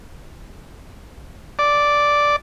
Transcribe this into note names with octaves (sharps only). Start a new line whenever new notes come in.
D5